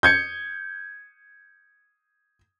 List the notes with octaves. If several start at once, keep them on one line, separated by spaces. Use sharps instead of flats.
G6 G#6 C#7